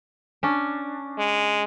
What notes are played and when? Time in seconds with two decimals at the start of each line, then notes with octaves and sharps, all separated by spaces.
0.43 C#4 D4
1.18 G#3